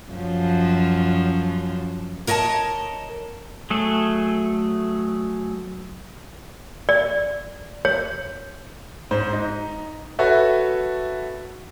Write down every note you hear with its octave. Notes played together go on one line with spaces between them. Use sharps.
F#2 F3
A#4 C#5 D#5 G5 A5
F#3 A3 G#4 A4
D5
C#5
G#2 C5
D#4
F#4 A4 B4 C#5 E5